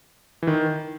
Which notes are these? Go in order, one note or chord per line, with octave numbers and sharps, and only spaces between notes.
E3
D#3